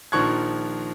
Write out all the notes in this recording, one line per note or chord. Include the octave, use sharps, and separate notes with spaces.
A#1 D#3 F3 C#6 F#6 G#6